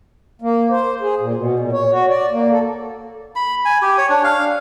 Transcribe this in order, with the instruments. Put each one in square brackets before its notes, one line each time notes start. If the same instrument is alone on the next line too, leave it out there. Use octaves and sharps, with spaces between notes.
[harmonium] A#3
C5
G#4
A#2
B2
A#2
C#5
F#4
D5
A#3
A4
[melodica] B5
G#5
G4
C#5
D4
F5